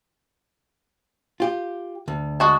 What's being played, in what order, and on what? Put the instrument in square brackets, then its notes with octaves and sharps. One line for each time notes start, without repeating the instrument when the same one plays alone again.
[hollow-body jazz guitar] F4 G4
D2
[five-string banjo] G#3 F#4 A5